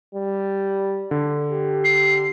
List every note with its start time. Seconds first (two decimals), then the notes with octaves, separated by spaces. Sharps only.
0.15 G3
1.11 D3
1.52 G4
1.84 C7